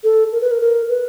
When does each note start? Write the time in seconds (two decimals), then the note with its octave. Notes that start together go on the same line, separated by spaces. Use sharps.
0.04 A4
0.32 A#4
0.41 B4
0.51 A#4
0.61 A#4
0.89 B4